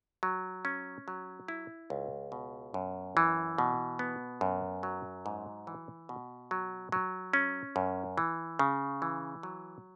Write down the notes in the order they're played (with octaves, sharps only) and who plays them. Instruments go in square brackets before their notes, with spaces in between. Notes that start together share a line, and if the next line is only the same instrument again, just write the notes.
[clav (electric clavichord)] F#3
C#4
F#3
E4
C#2
B2
F#2
E3
B2
B3
F#2
F#3
G#2
E3
B2
F#3
F#3
C#4
F#2
E3
C#3
E3
F#3